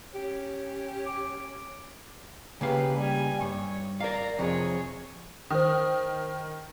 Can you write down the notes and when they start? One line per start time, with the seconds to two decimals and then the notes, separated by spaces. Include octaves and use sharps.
0.15 C#4 G4
1.06 D6
2.61 C#3 A#3 G4 B4 F5
2.97 G3 G#5
3.42 G2 C#5
4.00 A#4 D5 F5 A#5
4.38 F2 C3 G#4 C#5
5.50 D#3 C5 D#6